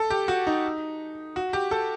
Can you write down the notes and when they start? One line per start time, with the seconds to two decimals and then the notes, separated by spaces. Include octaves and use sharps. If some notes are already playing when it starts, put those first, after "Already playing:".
Already playing: A4
0.10 G4
0.28 F#4
0.47 D#4
1.36 F#4
1.53 G4
1.71 A4